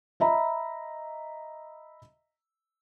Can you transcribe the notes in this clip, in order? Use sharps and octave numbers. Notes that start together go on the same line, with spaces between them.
D#5 E5 A#5 B5